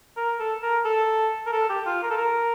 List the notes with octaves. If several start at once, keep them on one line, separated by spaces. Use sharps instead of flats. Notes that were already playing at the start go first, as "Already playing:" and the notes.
A#4
A4
A#4
A4
A#4
A4
G4
F4
A#4
A4
A#4